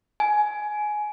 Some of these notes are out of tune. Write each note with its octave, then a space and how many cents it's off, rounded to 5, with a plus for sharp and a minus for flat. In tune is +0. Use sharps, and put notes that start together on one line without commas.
G#5 +15